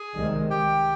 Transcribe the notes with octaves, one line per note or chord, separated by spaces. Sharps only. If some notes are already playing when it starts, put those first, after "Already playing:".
Already playing: G#4 G#5
C2 C3 D#3 G#3
G4 G5